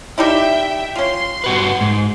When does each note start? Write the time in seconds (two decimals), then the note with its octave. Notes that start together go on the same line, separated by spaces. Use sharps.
0.18 G3 D#4 E4 E5 G5
0.96 C#4 F4 C6
1.44 G2 F#4 B4
1.81 G#2